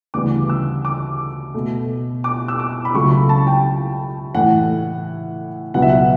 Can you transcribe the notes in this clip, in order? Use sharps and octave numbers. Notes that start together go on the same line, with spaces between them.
D2 C#3 E3 G3 B3 D6
E6
D6
B2 A3
D6
E6
D6
B5
C#2 C#3 F#3 A3 C#6
B5
A5
G5
A2 E3 A3 F#5
C#2 B2 F#3 B3 F#5
E5
F#5